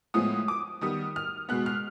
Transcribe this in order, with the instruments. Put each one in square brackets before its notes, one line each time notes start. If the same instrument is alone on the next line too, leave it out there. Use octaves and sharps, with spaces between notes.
[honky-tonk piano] A2 F3 G#3 B3 D#6
D6
D#3 G3 B3 D#6
F6
B2 G#3 B3 F#6
F6